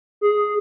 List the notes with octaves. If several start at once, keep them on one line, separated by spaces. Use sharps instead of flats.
G#4